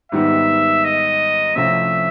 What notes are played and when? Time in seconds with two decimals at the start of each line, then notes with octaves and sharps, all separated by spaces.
0.12 G#2 D#3 G3 B3 D#4 E5
0.84 D#5
1.55 C2 C3 F3 A3 C#4 E5